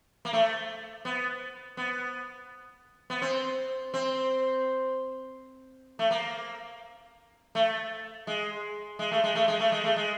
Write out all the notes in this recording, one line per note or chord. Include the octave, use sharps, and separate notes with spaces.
A#3
A3
B3
B3
B3
C4
C4
A3
A#3
A3
G#3
G#3
A3
G#3
A3
G#3
A3
G#3
A3
G#3